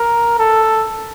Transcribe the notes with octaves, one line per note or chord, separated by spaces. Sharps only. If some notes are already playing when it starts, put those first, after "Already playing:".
Already playing: A#4
A4